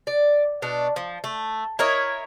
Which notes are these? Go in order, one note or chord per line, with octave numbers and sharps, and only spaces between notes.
D5
B2 D4
F3
A3
E4 A#4 C#5 D#5